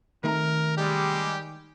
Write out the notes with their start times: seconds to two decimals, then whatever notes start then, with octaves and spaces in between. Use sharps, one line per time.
0.24 C3 D#3 A3 A#4 A#5
0.78 G3 G#3 G4